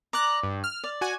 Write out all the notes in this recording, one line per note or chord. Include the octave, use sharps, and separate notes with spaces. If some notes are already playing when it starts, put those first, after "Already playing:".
D5 A#5 D6 F#6
G2
F6
D5
F#4 G#5